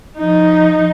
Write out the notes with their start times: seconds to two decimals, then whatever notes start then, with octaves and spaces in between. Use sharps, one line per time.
0.18 F3 D#4